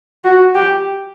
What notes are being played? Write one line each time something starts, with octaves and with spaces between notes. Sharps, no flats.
F#4
G4